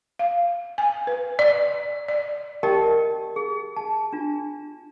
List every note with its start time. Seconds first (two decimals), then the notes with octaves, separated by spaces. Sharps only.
0.19 F5
0.78 G#5
1.07 B4
1.39 D5
2.09 D5
2.63 G4 A#4 D5 D#5 G5 A5
3.36 G#4
3.76 A5
4.13 D4 F4